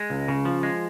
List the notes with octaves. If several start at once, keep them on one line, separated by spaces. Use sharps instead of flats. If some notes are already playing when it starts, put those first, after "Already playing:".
Already playing: G#3
C#2
C#3
F3
G#3